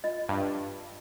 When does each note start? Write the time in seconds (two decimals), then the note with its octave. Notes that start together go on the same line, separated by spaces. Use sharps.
0.04 F4 D#5
0.29 G2